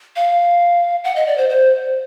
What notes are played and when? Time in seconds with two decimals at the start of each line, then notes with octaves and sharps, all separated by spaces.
0.16 F5
1.04 F#5
1.16 D#5
1.27 D5
1.37 C5
1.49 C5